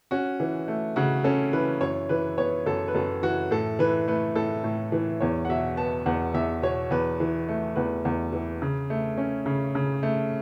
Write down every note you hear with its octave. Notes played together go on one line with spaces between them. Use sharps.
C#4 F#4
E3
A3
C#3 F#4
C#4 A4
E3 B4
F#2 C#5
E3 B4
B3 C#5
F#2 A4
B4
F#2 A4
E3 F#4
A2 A4
E3 B4
A3 B4
A2 A4
A2
E3
E2 C#5
F#5
B2 E5
B3 A5
E2 F#5
E2 E5
B2 C#5
E2 B4
E3
A3
E2 B4
E2
E3
C#3
A3
C#4
C#3
C#3
A3